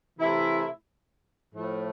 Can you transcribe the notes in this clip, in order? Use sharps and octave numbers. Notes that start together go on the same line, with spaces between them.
C3 E3 A3 E4
A2 F3 A3